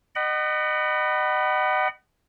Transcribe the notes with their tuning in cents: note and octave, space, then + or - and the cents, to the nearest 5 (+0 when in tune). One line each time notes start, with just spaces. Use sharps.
D#5 -30 F#5 +30 B5 +0